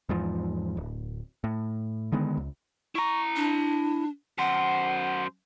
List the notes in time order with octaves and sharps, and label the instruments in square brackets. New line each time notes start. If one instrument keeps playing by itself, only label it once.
[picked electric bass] E2 G#2 F3
D1
A2
D3 D#3 G#3 B3
C#2
[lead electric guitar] E4 A#5 [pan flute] C#6
[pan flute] D4
[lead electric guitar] F#2 C5 [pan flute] F#5